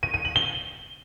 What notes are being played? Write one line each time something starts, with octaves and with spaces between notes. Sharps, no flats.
D#7
D#7
F#7
G7